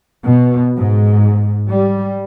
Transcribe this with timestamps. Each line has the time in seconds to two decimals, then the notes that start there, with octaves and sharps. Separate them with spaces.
0.24 B2
0.76 G#2
1.68 G3